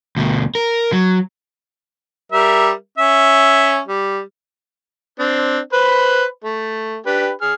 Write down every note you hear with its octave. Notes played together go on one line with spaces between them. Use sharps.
D2 B2
A#4
F#3
G3 A#4 E5
C#4 E5
G3
C4 D4
B4 C5 B5
A3
D4 G4 B4
G#4 F6